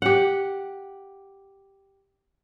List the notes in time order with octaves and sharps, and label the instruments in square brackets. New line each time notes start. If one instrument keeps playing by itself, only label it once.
[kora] G4 F#5